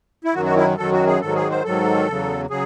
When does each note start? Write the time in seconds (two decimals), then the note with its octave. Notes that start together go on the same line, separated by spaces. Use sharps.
0.25 E4
0.34 F#2 D#3 F#3 F#4
0.45 F#4
0.56 E4
0.77 F#2 D#3 F#3 A4
0.92 F#4
1.07 G#4
1.20 G#2 D#3 F#3 A4
1.35 G#4
1.50 C5
1.64 G#2 D#3 F#3 A4
2.07 E2 C#3 F#3
2.50 C#3 F#3 G#4